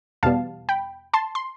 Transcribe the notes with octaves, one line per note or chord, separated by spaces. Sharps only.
E2 B2 G3 B3 F5 A5
G5 B5
A5 C6
C6